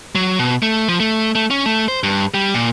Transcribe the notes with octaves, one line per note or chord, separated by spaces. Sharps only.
F#3
B2
A3
F3
A3
A3
C#4
A3
C5
G2
G3
A#2